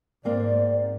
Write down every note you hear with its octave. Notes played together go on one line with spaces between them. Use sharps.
G#2 A#3 C4 D5